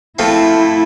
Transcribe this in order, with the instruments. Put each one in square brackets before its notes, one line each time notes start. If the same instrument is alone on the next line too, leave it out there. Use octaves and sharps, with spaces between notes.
[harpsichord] F3 A3 C4 [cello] E4